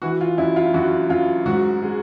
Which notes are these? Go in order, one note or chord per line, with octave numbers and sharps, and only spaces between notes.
E3 F#4
F4
F#2 E4
F4
F#2 F#4
F#2 F4
G#2 F#4
G#3